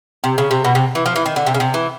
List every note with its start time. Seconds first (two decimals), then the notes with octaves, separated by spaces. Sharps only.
0.24 C3
0.38 C#3
0.51 C3
0.65 B2
0.75 C3
0.95 E3
1.06 F3
1.16 E3
1.26 D#3
1.36 D3
1.46 C3
1.54 C#3
1.60 C3
1.74 E3